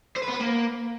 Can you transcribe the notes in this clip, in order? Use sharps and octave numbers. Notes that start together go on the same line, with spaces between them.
C5
B4
B3
B4
A#3